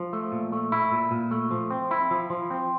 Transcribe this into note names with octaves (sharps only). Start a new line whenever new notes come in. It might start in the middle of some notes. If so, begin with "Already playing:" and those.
Already playing: F3
A3
A#2
A3
E4
A#2
A#2
A3
F3
C4
E4
F3
F3
C4